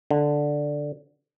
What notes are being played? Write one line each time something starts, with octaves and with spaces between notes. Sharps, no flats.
D3